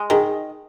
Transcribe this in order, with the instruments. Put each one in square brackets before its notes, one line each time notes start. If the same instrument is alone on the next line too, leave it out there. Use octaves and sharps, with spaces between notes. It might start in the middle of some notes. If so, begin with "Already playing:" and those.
Already playing: [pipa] G#3
[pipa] D#3 [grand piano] G#4